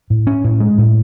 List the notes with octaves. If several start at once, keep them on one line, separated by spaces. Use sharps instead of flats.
A2
C#4
A2
G#3
A2